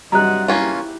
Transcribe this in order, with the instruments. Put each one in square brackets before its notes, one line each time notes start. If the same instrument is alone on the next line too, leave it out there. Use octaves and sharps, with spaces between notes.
[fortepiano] G2 C3 F#3 [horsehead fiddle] D#5 F#5 [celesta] A#5 F#6
[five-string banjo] A#3 C#4 F4 [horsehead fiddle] E4 G4